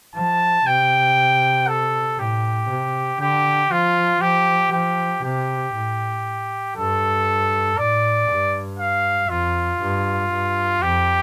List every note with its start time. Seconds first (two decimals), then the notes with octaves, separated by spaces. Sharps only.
0.15 F3 A5
0.66 C3 G5
1.68 A4
2.18 A2 G4
2.70 C3
3.20 D3 G4
3.71 F3 F4
4.21 F3 G4
4.72 F3 G4
5.23 C3 G4
5.75 A2
6.76 G2 A4
7.77 A2 D5
8.29 G2
8.79 F5
9.29 F2 F4
9.81 G2
10.32 G2
10.82 F2 G4